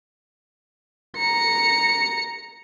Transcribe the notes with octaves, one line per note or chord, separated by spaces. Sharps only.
A#5 C#7